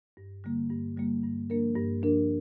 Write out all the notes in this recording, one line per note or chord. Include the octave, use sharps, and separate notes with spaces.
G2
D3 G3 A#3
G2
D3 G3 A#3
G2
F3 A#3 D4 A#4
G2
F3 A#3 D4 A#4